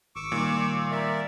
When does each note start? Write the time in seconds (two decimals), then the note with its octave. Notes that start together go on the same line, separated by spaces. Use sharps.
0.16 G#1 C#6 D6 E6
0.32 A#2 D#3 G3
0.91 A#4 D5 E5